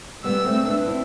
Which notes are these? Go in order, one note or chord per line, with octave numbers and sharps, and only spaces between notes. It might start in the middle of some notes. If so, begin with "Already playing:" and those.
G3 B3 E6
A3 C4
B3 D4
D4
C4 E4